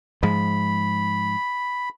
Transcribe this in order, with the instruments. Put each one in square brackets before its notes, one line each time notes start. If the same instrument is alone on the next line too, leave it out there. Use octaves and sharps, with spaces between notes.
[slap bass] G#2 F3 G#3 [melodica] B5